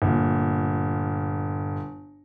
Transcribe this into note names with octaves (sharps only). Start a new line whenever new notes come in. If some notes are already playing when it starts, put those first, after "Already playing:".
G1 A#2